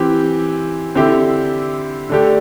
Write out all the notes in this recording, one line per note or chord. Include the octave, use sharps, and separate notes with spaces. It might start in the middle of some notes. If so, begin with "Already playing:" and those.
Already playing: E3 C4 G4
D3 C4 E4 G4
D3 A3 D4 G4